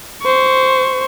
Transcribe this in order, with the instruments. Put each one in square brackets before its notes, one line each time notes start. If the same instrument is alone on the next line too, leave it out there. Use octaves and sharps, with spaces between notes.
[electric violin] C5 C#6